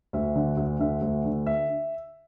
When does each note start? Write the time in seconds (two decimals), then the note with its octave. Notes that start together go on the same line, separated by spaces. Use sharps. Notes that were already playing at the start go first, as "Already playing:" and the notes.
0.13 D2 E5
0.35 D3
0.57 D2
0.80 D3 E5
1.02 D2
1.25 D3
1.47 E5